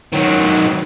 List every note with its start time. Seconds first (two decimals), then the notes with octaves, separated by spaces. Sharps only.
0.13 D#3 F#3